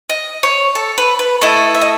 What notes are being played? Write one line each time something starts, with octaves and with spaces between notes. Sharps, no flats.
D#5
C#5
A4
B4
B4
A3 E4 A4 D#5
E5
D#5